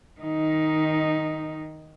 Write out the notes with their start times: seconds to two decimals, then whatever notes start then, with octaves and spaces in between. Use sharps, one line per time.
0.21 D#3 D#4